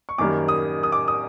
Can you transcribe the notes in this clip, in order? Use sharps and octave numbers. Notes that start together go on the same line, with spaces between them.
C#6
F#2 D#3 G3 A#3 D6
D#6
D#6
D6
D#6